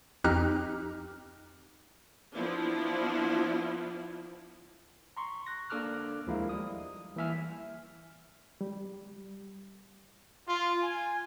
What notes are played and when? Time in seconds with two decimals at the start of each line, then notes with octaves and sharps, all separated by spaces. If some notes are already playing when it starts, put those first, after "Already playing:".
0.24 F2 D#4 G4 A#5 F6 F#6
2.34 F3 B3 D4 E4 F4
5.17 A#5 C6 C#6
5.47 F#6 A#6
5.70 A#3 D4 A4 D6 F6 F#6
6.27 D#2 F3 G#3 E4 A#4 F5
6.49 G3 D#6
7.16 E3 A#3 B4 E5 G#5 F6
8.61 G3
10.48 F4
10.82 G#5